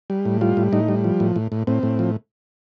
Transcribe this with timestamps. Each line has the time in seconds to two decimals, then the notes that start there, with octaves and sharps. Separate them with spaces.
0.10 G3
0.25 A2
0.41 G3 F4
0.57 A2
0.72 A2 D#4
0.88 G3
1.04 F3
1.20 A2
1.36 A2
1.52 A2
1.67 A2 C4
1.83 A2
1.99 F3